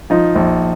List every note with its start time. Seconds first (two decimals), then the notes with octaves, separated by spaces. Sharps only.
0.10 F3 D#4
0.35 A#1